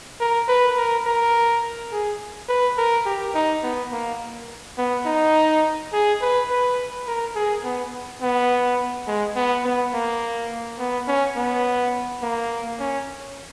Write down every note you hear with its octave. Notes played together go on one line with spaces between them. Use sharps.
A#4
B4
A#4
A#4
G#4
B4
A#4
G4
D#4
B3
A#3
B3
D#4
G#4
B4
B4
A#4
G#4
B3
B3
G#3
B3
B3
A#3
B3
C#4
B3
A#3
C#4